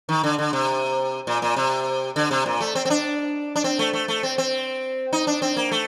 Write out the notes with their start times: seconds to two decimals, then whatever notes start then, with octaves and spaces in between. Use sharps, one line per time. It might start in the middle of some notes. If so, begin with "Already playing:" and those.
0.09 D#3
0.23 D3
0.38 D3
0.53 C3
1.27 A#2
1.42 A#2
1.56 C3
2.16 D3
2.31 C3
2.46 A#2
2.60 A3
2.75 C4
2.85 C4
2.90 D4
3.56 D4
3.64 C4
3.79 A3
3.93 A3
4.08 A3
4.23 C4
4.38 C4
5.13 D#4
5.27 D4
5.42 C4
5.57 A#3
5.71 A3